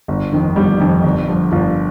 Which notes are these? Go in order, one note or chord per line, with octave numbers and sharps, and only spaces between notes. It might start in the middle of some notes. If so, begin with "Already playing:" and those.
G1
F2 D#3
G1 G3
F2 D#3
G1
G2 D3 F3
G1 F4